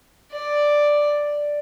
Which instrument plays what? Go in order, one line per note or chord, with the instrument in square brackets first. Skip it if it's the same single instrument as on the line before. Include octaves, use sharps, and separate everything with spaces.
[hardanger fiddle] D5